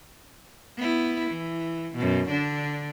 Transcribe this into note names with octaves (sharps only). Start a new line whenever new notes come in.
B3 E4
E3
F#2 B2
D3 D4